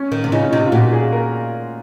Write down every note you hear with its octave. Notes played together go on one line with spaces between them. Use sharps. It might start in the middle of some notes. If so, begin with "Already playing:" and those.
Already playing: C#4
D#3
C3
C#3 D#4
C#4
C3 D#4
F4
A#2 F#4
G#4
A#4